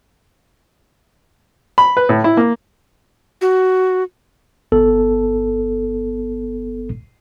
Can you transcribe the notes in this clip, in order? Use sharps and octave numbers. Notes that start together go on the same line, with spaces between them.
B5
B4
A2
E4
A#3
F#4
G1 B3 A4